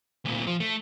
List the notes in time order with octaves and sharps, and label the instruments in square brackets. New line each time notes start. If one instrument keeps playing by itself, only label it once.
[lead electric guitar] D2 A#2
F3
A3